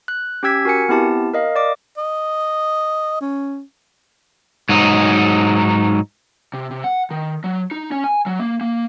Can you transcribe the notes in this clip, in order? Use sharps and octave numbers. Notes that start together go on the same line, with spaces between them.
F#6
C#4 G4 G5 E6 G#6 B6
F#4 A#4 G#5 C#7
B3 C4 E4 G4 A5
A#4 D#5 F5
D5 D6
D#5
C#4
G#2 F#3 D#4
C3
C3
F#5
D#3
F#3
D#4
C#4
G#5
F#3
A#3
A#3